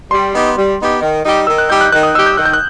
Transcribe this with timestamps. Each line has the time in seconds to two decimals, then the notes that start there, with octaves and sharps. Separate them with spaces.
0.11 G3 C6
0.33 B3 D#4 G4
0.57 G3
0.79 B3 D#4 G4
1.01 D#3
1.24 G3 D#4 G4
1.47 D#3 E6
1.58 F#6
1.69 G3 D#4 G4 G6
1.81 F#6
1.92 D#3 F#6
2.03 D#6
2.15 G3 D#4 G4 E6
2.26 G6
2.37 D#3 F#6
2.46 G6
2.53 F#6